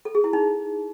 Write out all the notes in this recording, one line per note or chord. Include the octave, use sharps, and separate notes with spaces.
A4
G#4
E4
D#4